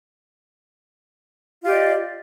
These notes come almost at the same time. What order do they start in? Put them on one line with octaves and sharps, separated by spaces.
F4 G4 D#5 D5